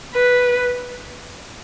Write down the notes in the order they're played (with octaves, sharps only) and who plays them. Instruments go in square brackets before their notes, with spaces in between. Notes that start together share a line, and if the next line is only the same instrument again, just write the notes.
[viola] B4